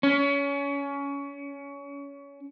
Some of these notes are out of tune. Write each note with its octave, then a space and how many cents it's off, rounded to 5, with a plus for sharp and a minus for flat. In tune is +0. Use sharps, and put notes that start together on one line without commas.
C#4 +25